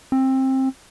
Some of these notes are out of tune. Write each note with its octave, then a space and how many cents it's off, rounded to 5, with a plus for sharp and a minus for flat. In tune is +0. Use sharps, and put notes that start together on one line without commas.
C4 +20